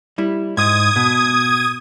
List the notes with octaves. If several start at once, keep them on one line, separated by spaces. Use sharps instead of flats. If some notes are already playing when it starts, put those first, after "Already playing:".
G3 E4
G#2 D#6 G#6
B2